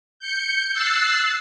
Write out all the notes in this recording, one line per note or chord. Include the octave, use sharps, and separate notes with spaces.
G6 C#7
E6 F#6 A6 C7